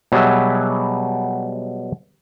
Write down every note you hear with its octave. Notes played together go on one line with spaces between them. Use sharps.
B2 F#3 G3 G#4 B4 E5